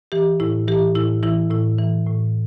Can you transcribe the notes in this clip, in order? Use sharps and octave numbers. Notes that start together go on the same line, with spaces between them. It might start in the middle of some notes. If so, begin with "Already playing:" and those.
E3 G4
A2 E4
E3 G4
A2 E4
E3 E4
A2 E4
E3
A2